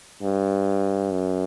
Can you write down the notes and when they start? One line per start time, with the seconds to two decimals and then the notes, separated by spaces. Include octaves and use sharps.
0.22 G2
1.11 F#2